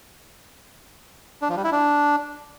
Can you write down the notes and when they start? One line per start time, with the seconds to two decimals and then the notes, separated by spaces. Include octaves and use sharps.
1.42 D4
1.49 F3
1.57 G3
1.64 E4
1.72 D4